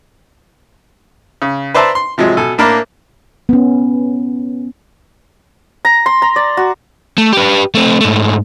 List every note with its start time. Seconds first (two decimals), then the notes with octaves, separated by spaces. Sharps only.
1.42 C#3
1.74 B4 C5 D5 E5 A5 A#5
1.95 C6
2.18 C3 F3 F#3 G#3
2.37 B2 A4 G#5
2.58 A2 A#3 D4 A#4 B5
3.49 B3 C#4
5.85 A#5
6.06 C6
6.22 A#5
6.36 D5
6.57 F#4
7.18 A3
7.33 G4 B4
7.75 A3 C4
8.01 G#2 A3